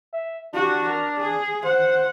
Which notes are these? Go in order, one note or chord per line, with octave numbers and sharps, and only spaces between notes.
E5
D4 F#4 G4
A#4
G#4
C5 F#5